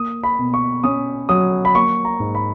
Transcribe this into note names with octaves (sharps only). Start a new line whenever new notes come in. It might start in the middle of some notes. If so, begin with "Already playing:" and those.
Already playing: A#3 D#6
B5
B2
C#6
C#4 D#6
F#3 D#6
B5
A#3 C#6
A#5
G#2
B5